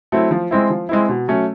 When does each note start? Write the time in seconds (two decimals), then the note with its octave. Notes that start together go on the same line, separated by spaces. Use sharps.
0.12 F#3 A3 C4 E4
0.31 F3
0.51 G#3 C4 E4
0.70 F3
0.89 G#3 C4 E4
1.09 B2
1.28 F#3 A3 C#4